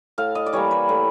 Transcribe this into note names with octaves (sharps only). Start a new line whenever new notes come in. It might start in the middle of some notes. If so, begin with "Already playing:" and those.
A2 F5
D#5
D5
E3 G3 A#3 C#5
B4
A2